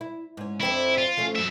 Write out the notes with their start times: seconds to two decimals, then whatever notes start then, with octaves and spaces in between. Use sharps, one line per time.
0.01 E4
0.37 G#2 C#4
0.61 F2 C4 D4 E4
0.98 F4
1.17 F3 A3 C#4
1.35 F#3 E5